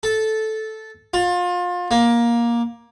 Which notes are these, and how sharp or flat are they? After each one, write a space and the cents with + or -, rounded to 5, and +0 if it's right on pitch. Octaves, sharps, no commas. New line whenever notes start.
A4 -10
F4 +30
A#3 +15